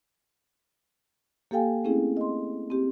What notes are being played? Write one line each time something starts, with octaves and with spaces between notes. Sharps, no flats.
A#3 G4 A4 F5 G5 G#5
A3 C4 C#4 E4 G#4
D#5 C6
C4 G4